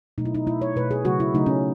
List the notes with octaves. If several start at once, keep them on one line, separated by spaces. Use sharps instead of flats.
B2 F#3 A3 D#4
E4
D#4
B2 A3 E4
C#5
B2 A3 B4
G#4
C#3 F#3 A3 F#4
E4
C#3 F#3 A3 D#4
C#4